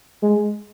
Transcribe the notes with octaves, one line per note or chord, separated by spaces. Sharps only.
G#3